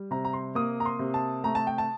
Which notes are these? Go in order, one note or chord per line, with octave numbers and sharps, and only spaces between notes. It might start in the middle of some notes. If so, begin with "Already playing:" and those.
Already playing: G3
C3 A#5
A#5
C6
A#3 D#6
A#5
C6
C3
A5
A3 A#5
A5
G5
A5